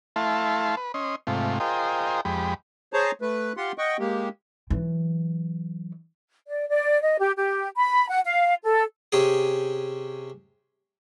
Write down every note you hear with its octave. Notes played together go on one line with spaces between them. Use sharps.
A3 E4 F5 A5 C6
B4
C#4 D#5 C6
G#2 C3 A3 F4
F4 G#4 A#4 C5 D#5 G5
F2 G#3 G4 B5
G#4 C5 C#5 A5 A#5
A3 B4
F4 G4 F#5 C6
D#5 F#5 G5 C#6
G#3 A#3 G4
E3 F#3
D5
D5
D#5
G4
G4
B5
F#5
F5
A4
C3 C#4 G4 G#4